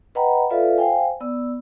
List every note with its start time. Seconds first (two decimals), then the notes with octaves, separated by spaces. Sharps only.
0.15 B4 D#5 F#5 G5 A#5 B5
0.50 F4 A4 B4 D5 E5 F5
0.78 C5 F5 G5 G#5
1.20 B3 D5 E6